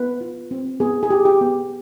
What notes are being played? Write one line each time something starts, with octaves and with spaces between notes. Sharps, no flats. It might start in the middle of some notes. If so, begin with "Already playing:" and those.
Already playing: B3 B4
F4
C4
B3 G#4
G#4
G4
G4
B3